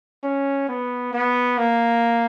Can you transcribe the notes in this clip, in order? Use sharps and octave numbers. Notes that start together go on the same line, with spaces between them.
C#4
B3
B3
A#3